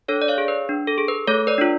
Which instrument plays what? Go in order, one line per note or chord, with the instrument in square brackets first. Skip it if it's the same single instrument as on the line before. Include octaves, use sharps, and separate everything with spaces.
[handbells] D4 A4 C#5
D5
C#5 F5
G#4
B4
D4
A4
G#4
B4
A3 A4 C#5
B4 D5
D4 F4